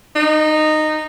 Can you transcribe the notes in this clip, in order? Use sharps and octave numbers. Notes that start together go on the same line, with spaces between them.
D#4